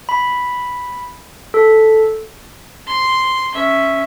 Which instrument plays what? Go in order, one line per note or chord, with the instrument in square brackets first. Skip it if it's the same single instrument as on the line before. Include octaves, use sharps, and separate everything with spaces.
[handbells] B5
A4
[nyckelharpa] C6
C#4 E5